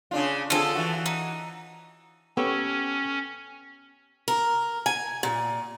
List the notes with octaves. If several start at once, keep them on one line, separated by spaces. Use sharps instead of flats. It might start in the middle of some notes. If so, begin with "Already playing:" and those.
C#3 D4 F4
D3 C4 F4 G#4 A4
E3 F#4
D#4
B3 C#4 G4 A4 C#5
A#4
G#5
A#2